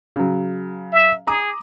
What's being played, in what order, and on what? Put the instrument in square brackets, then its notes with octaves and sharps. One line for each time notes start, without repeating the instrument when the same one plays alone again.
[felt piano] C#3 F#3
[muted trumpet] E5
[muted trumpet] G#4 [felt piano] A#5 D6 D#6